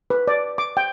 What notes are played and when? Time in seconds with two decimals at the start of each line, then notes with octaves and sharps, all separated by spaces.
0.10 B4
0.28 D5
0.58 D6
0.77 G5